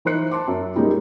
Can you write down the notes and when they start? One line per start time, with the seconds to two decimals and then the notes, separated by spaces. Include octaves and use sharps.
0.05 E3 D#4 C5 F#6 C#7
0.31 A5 C6 D6
0.48 F#2
0.75 G3 G#3 A#3 C#4 D#4 G4